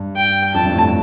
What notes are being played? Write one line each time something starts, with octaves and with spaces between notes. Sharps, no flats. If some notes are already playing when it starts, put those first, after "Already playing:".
Already playing: G2
G5
F2 A5
G2
A2